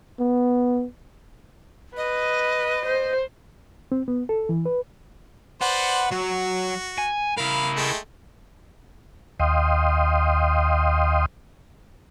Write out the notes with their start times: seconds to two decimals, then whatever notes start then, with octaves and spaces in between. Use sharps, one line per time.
0.19 B3
1.97 B4 D#5
2.86 C5
3.92 C4
4.08 B3
4.29 A4
4.49 E3
4.65 B4
5.61 B4 C5 D5 F#5
6.11 F#3 F#4
6.98 G#5
7.37 E4 A#4 F5 B5
7.77 G#3 A3 G5
9.40 D#2 D#5 F5 G5 C6 D#6